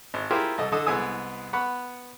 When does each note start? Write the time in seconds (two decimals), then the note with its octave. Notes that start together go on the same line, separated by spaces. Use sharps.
0.14 G#1
0.31 E4 F4 G4 G#4 A#4 C5
0.58 C2 A4 D#5
0.72 D3 A4 D#5 D#6
0.86 C2 G#3 B3 G#5 D#6 E6
1.53 B3 F#5 B5 C#6